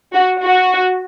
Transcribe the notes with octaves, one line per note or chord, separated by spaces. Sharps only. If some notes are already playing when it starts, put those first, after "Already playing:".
F#4
F#4